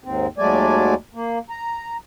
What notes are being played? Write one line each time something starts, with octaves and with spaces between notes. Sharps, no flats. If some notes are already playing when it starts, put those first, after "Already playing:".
D#2 G#2 C4
D#2 F#3 G#3 A3 D5 G#5
A#3
A#5